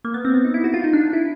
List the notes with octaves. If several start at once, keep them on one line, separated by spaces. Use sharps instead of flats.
A#3
B3
C4
B3
D#4
E4
F#4
F4
D#4
D4
E4